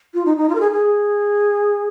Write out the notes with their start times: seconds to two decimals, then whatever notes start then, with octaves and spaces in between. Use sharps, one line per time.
0.14 F4
0.26 D#4
0.37 D#4
0.49 F4
0.55 A#4
0.60 G#4
0.72 G#4